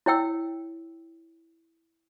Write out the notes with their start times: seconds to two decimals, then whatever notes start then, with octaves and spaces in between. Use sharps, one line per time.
0.06 E4 C#5 G5 E6